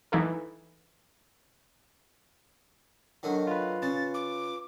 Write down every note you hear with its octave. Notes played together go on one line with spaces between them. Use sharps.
E3 D#4 E4 A4
D3 D#3 F#3
F4 B4
C#3 A6
D6